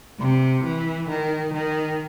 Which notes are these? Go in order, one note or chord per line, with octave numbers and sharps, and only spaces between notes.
C3
E3
D#3
D#3